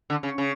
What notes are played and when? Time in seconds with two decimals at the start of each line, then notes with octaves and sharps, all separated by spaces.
0.10 D3
0.23 C#3
0.38 C#3